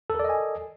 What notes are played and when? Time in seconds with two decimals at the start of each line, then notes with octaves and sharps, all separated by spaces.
0.10 A4
0.15 A#4
0.19 D5
0.24 D#5
0.29 G#5